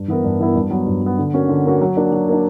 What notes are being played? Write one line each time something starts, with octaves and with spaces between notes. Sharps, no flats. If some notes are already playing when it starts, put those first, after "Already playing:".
Already playing: G2
E3 B3 E4 A#4
G2
E3 B3 E4 A#4
G2
F#3 B3
G2
F#3 B3
D3
A#3 C#4 F#4
D3
A#3 C#4 F#4
F#3
A#3 D4
F#3
A#3 D4